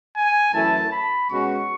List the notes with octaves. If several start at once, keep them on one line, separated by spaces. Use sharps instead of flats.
G#5
F#2 E3 A3 E4 A5
B5
B2 G#3 C#4 F#4 C#6